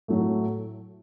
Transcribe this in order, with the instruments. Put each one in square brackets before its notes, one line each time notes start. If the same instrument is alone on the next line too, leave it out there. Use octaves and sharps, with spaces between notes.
[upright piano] A2 F#3 A3